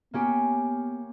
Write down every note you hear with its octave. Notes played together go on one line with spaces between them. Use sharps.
A#3 B3 C#4 G4